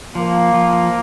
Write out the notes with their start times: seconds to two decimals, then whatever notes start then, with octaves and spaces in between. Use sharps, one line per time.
0.15 F3 A#3
0.54 F3